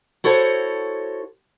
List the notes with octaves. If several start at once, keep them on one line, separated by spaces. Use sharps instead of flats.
E4 F#4 A4 C5 C#5